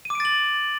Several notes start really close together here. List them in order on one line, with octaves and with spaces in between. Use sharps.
D#7 D6 D7 A6 F#7